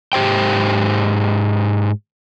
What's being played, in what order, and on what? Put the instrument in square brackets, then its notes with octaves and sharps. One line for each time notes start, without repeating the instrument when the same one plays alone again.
[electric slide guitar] G#2 G4 C5 G5